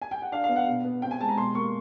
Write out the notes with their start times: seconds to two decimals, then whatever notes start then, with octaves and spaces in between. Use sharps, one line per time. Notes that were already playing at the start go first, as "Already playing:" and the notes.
0.02 G#5
0.11 G5
0.22 F#5
0.32 D4 F5
0.44 F5
0.49 B3
0.56 F#5
0.68 B2
0.85 B3
1.02 C4 G5
1.11 G#5
1.20 G#3 A5
1.29 A#5
1.38 B2 C6
1.55 A#3 C#6